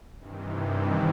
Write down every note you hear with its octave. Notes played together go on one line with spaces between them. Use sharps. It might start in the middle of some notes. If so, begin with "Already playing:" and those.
G2 C3 D#3 E3